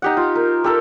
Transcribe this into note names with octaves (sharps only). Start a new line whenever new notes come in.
D#4 G4 F#5
F4
A#4
G4 A4 A#4